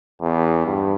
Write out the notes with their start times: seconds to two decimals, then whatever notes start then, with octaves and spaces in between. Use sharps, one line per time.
0.21 E2
0.66 G2